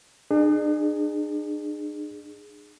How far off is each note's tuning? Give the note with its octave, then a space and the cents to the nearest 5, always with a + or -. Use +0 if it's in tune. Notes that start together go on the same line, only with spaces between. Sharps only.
D4 +45 G#4 -5